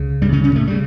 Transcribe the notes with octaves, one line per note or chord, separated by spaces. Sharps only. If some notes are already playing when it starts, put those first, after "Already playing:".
Already playing: C#2 C#3
G2 G3
C#3 C#4
C#3 C#4
A2 A3
C#3 G3